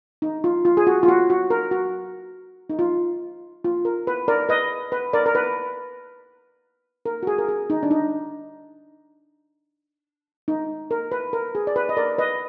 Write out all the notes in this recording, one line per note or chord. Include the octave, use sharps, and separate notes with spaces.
D#4
F4
F4
G#4
F#4
F4
F#4
F#4
A#4
F#4
D#4
F4
F4
A#4
B4
A#4 D5
B4 D#5
B4
A#4 D5
A#4
B4
A#4
F#4
G#4
A#4
G#4
D#4
D4
D#4
D#4
A#4
B4
A#4
G#4
D5
B4
D#5
A#4 D5
B4 D#5